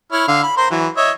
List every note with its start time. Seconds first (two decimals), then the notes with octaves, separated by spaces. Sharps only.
0.12 E4 C#5 F6
0.28 D3 F5
0.43 B5
0.57 A#4 C5 C6
0.71 E3 F#3
0.97 C#5 D#5 E5